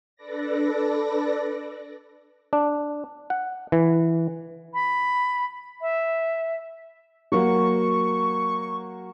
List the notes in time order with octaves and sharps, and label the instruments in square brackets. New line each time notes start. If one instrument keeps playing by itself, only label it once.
[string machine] D4 A4 B4 D5 A#6
[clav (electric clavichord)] D4
F#5
E3
[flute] B5
E5
[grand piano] F#3 A#3 F#4 [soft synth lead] C#6